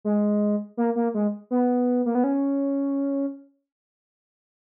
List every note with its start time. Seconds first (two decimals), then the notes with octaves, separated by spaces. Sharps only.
0.05 G#3
0.77 A#3
0.96 A#3
1.14 G#3
1.51 B3
2.06 A#3
2.15 B3
2.24 C#4